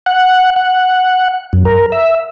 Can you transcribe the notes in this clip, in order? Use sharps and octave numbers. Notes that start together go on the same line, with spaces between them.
F#5
F#5
F#2
A#4
E5